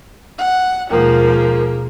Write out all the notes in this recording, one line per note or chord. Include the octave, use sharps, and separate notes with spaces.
F#5
D#2 B2 F3 G#3 A#3 A#4